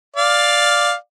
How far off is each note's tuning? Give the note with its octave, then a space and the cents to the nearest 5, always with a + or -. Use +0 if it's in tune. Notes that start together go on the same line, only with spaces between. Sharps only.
D5 +0 F5 +5